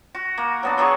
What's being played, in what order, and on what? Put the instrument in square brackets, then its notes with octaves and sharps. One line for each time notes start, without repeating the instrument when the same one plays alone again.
[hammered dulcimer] F#4
A#3
F#3 B3 D4
F#3 B3 G#4 C#6